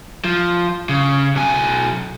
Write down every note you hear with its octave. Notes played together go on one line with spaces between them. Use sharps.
F3
C#3
B1 G#5